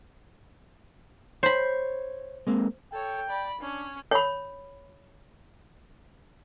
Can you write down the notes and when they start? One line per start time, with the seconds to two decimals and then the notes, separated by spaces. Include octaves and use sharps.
1.43 C5 C#5 B5
2.47 G#3 A#3 C4
2.93 A4 C#5 G5
3.29 D5 B5
3.61 C#4 D4 C#5
4.11 C#5 B5